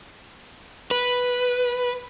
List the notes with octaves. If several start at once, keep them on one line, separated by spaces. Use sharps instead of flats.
B4